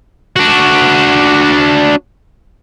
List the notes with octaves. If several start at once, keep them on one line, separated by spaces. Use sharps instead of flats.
D4 F#4